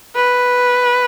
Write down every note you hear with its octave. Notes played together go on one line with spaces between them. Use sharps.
B4